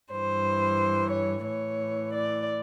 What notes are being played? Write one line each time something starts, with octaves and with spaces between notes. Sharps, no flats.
G2 E3 C5
C#5
A2 E3 C#5
D5